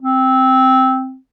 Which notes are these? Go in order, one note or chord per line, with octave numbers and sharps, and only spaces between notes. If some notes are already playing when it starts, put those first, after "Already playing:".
C4